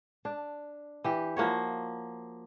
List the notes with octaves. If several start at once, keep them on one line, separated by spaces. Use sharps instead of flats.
D4
E3 G4
F3 A#3 F#4 C#5